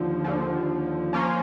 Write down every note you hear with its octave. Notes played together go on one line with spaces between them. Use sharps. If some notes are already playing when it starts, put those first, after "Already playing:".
Already playing: D#2 D3 F3
D#2 D3 F3
F3 A#3 C#4 F4